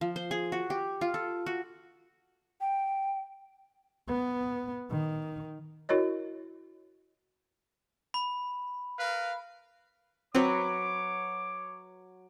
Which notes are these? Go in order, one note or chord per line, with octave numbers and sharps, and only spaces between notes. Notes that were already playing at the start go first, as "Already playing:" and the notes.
F3
C5
G#4
F#4
G4
F4
A4
F#4
G5
B3
D#3
E4 F#4 A#4 C#5 D#5
B5
A#4 B4 F5
F#3 C4 B4 C#5 D6